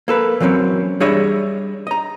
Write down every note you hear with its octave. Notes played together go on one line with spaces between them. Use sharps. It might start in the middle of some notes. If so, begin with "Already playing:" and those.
A#3 A4 B4
E3 F#3 A#3 C4 C#4
G3 D4 G#4 C#5 D#5 E5
D#5 A#5